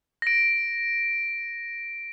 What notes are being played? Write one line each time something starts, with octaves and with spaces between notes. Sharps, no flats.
A#6 D7